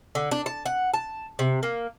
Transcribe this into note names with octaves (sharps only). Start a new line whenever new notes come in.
D3
D4
A5
F#5
A5
C3
A#3